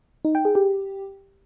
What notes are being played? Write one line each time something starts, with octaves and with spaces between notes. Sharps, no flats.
D#4
G5
G#4
G4